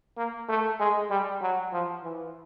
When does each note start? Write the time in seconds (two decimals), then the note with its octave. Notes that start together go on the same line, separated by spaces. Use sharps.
0.17 A#3
0.49 A3
0.80 G#3
1.10 G3
1.42 F#3
1.73 F3
2.04 E3